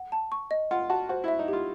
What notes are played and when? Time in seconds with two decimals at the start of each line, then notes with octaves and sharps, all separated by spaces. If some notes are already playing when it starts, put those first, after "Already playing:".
Already playing: F#5
0.12 A5
0.32 C#6
0.51 D#5
0.71 F4 F#5
0.90 F#4 A5
1.09 F#4 C5
1.24 E4 E5
1.39 D#4
1.48 F4 G4